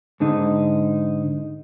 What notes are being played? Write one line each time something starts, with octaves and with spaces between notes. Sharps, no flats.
G#2 D3 D#4